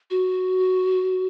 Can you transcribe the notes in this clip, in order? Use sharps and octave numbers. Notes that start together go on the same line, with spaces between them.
F#4